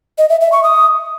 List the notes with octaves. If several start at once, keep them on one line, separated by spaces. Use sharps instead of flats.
D#5
E5
E5
C#6
D#6